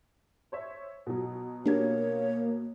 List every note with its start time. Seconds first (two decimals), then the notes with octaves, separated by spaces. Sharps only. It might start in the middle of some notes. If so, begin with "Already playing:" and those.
0.52 C5 C#5 E5
1.07 B2 F#3
1.66 A#3 D4 G4 C#5 G#6